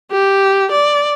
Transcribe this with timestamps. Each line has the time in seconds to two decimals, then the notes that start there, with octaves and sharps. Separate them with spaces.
0.12 G4
0.71 D5